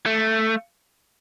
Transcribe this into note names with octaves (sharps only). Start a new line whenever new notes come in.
A3